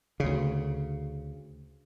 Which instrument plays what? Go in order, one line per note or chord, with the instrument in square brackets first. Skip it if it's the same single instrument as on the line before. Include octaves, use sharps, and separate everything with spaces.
[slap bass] D2 C#3